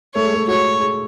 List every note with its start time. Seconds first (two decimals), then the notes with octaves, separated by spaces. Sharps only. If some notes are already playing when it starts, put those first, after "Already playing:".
0.15 A3 C#5
0.24 G#3
0.34 A3
0.48 F#4 C#5
0.80 G#4